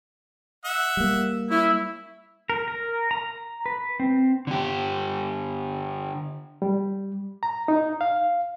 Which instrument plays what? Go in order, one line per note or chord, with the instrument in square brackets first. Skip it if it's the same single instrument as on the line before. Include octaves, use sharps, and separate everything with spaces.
[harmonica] E5 F#5
[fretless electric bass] G3 A#3
[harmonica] C#4 [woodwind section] E4
[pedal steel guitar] A#4
A#4
A#5
B4
C4
[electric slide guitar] D3 G4
[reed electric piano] G3
A#5
D#4
F5